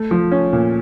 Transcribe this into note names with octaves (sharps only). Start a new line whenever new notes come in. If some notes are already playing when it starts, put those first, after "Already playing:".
Already playing: A3
F3
C#4
A#2